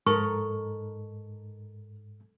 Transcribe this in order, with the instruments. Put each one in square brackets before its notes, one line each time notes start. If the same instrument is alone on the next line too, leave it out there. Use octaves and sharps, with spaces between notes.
[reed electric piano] G#2 [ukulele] D#4 A#4 A#5 [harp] A4 [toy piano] C#6